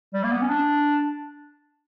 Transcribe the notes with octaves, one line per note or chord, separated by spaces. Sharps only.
G3
A#3
B3
C#4
D4